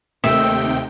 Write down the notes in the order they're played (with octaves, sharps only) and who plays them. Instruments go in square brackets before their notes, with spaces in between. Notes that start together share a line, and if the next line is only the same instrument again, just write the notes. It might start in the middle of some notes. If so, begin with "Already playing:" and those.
[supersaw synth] D#2 C3 G5 [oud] D#3 A3 C4 [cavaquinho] E5